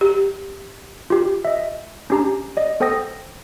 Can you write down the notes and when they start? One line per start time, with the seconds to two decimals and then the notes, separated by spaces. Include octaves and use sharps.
0.01 G4
1.10 F4 G4
1.45 D#5 E5
2.10 C#4 D4 G4 A5 A#5
2.57 D5 D#5
2.80 B3 A4 C5 G5 D#6 A#6